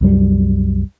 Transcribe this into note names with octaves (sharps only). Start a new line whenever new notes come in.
C2 F#2 G3